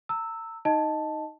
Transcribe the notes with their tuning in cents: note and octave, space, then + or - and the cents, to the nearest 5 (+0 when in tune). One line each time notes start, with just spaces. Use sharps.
A#5 -40 E6 -5
D#4 +5 D#5 +0 A5 +0